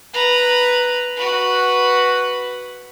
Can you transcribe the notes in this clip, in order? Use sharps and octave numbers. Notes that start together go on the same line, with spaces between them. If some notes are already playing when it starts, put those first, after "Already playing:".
B4 A#5
F#4 B4